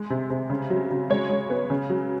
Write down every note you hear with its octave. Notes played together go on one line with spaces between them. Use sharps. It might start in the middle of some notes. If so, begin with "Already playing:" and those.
Already playing: G#3
C3
C3
C#3
F#3
C#3
G#3 C#5
G#3
B3
C#3
F#3